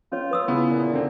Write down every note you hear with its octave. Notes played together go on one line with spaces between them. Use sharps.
C#4 F4 C#5
B4 D#6 E6
C#3 B3 E4
A#2
D3 C4